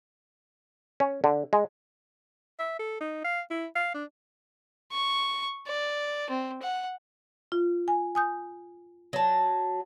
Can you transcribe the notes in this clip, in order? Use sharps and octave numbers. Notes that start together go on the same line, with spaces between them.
C#4
D3
G#3
E5
A4
D#4
F5
E4
F5
D4
C#6
D5
C4
F#5
F4
G#5
G#5 D#6 G6
F#3 A5